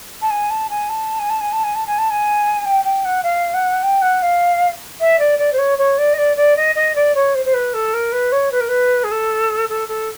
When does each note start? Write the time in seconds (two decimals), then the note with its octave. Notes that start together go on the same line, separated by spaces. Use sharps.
0.21 A5
0.30 G#5
0.50 A5
0.69 G#5
0.89 A5
1.19 G#5
1.29 A5
1.40 G#5
1.52 A5
1.63 G#5
1.74 A5
1.86 G#5
1.98 A5
2.10 G#5
2.65 G5
2.84 G5
3.04 F#5
3.23 F5
3.53 F#5
3.82 G5
4.01 F#5
4.22 F5
5.00 E5
5.19 D5
5.38 D5
5.52 C5
5.58 C#5
5.78 C#5
5.98 D5
6.13 D#5
6.17 D5
6.36 D5
6.56 D#5
6.75 D#5
6.95 D5
7.14 C#5
7.34 C5
7.45 C5
7.53 B4
7.73 A4
7.93 A#4
8.12 B4
8.31 C#5
8.51 B4
8.60 A#4
8.68 B4
9.03 G#4
9.11 A4
9.69 A4
9.88 A4